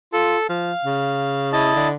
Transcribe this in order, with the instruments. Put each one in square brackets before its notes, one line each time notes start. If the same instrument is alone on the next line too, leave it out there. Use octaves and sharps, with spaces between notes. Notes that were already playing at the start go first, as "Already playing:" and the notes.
[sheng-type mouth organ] F4 [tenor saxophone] A4
[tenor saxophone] F3 [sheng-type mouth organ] F5
[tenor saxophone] C#3
[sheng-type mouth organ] E4 D#5 A5
[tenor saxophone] D3